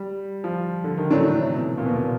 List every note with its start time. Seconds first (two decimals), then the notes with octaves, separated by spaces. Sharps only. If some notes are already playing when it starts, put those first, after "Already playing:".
Already playing: G3
0.44 F3
0.84 D3
0.98 D#3
1.11 A2 E3 F#3 A3 D4
1.33 C3
1.55 B2
1.78 A#2
1.86 B2
1.94 A#2